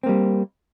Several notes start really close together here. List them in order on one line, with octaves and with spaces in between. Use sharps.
C4 A#3 G3